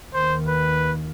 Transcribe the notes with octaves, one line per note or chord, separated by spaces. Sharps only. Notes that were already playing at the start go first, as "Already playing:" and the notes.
D#2 D#3 C5
B4